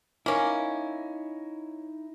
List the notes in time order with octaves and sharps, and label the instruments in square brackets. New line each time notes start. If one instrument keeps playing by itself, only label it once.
[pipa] A#3 C#4 [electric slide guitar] D#4 E4